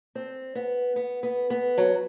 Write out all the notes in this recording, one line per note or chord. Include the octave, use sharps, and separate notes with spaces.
C4
B3
B3
B3
B3
F#3